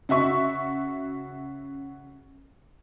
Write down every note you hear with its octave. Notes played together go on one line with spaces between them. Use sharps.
C#3 F#4 E5 C#6